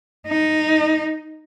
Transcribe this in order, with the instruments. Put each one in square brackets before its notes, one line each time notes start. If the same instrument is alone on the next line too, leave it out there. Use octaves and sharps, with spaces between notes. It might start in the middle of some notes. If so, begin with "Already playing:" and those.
[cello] D#4